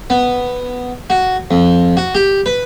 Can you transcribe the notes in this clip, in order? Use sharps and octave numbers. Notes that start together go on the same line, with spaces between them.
B3
F#4
F2
F#4
G4
B4